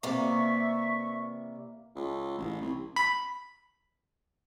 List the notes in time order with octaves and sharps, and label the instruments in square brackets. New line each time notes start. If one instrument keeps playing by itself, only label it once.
[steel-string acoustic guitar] C3 E3 [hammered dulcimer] A#3 [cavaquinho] D5 [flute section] E5 C#6
[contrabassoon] C#2
A1
C2
[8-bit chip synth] B5